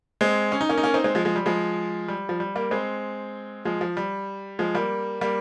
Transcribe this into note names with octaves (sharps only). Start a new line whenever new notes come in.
G#3 C4
C#4
D#4
A#3 C#4
D#4
A#3 C#4
C4 D#4
G#3 C4
F3 G#3
F3 G#3
G3
F3 G#3
G3
F3
G3
G3 A#3
G#3 C4
F3 G#3
F3
G3
F3 G#3
G3 A#3
G3 A#3